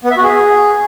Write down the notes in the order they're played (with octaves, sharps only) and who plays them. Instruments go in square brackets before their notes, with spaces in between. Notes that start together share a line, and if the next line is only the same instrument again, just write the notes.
[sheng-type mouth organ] B3
E5
F#4
G#4